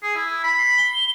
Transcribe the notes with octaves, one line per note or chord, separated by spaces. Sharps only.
G#4
E4
B5
C7
G7